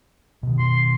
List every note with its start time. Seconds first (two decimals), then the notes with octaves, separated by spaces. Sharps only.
0.43 B2 D#3
0.59 C6